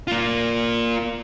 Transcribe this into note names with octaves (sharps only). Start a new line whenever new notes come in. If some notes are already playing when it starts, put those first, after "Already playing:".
A#3 F4